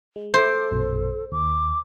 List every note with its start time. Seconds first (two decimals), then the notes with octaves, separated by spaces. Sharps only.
0.16 G#3
0.34 A4 C5 E5 D6
0.71 A#1 F#2 B2
1.32 D#2 D6